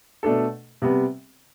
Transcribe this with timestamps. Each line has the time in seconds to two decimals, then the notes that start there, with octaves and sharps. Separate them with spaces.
0.23 B2 A3 D4 A4
0.82 C3 G3 B3